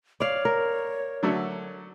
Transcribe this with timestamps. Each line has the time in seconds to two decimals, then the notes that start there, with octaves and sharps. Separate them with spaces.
0.20 C#5 D5 F5
0.45 A#4
1.23 D3 F#3 A3